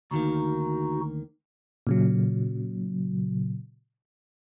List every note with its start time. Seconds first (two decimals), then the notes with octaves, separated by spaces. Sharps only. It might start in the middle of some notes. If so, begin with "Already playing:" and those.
0.11 D2 D#3 A#3 D#4 F#4
1.87 A#2 C#3 F#3